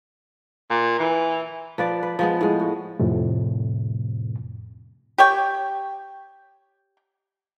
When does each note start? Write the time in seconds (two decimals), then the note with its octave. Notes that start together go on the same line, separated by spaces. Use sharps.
0.70 A#2
1.00 E3
1.78 F3 B4 D5
2.03 B4
2.19 F3 G#3 B3
2.41 A2 G#3
2.60 F#4
2.99 F2 A2 C3
5.18 G4 C#5 G5